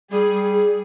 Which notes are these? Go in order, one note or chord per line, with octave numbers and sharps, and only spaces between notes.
G3 G#4